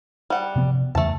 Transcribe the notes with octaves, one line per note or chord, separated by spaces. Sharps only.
G3 F#5
C3 F3 B3
E2 C#3 E3 A3 A5